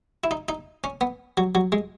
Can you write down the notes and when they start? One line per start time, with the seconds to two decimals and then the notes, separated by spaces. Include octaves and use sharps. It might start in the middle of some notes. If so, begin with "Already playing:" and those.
0.24 E4
0.31 D#4
0.49 D#4
0.84 C#4
1.01 B3
1.37 F#3
1.55 F#3
1.72 G#3